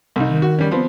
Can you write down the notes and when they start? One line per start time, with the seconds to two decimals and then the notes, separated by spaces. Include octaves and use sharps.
0.16 C2 D#4
0.29 D#3
0.42 F#4
0.59 G3 C#4
0.71 F3 B3 C4